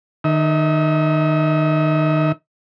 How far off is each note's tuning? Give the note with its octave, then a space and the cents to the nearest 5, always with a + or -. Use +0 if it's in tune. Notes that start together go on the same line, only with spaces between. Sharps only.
D#3 -25 E5 -45